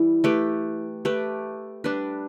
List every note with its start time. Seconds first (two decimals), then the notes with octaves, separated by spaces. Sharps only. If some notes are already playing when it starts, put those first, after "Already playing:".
Already playing: E3 G3 E4
0.24 A3 G4 B4
1.05 A3 G4 B4
1.84 G3 D4 B4